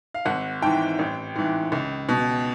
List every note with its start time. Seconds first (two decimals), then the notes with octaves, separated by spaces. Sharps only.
0.14 F5
0.25 G#1 F#5
0.62 G#2 E3 G5
0.99 A1
1.36 G#2 E3
1.72 C#2
2.09 B2